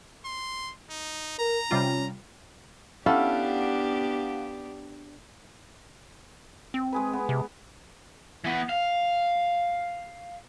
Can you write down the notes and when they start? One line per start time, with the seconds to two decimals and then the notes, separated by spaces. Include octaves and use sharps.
0.25 C6
0.90 D#4
1.39 A#4 A#5
1.71 C3 G3 C#4 F4
3.06 B3 C#4 D4 E4 G4 A4 F5 F#5
6.74 C4
6.92 G#3 G#4 B4
7.13 B3
7.29 C3
8.44 E3 B3
8.69 F5